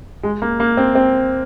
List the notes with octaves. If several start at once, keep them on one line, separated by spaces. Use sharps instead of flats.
G#3
A#3
A#3
C4
C4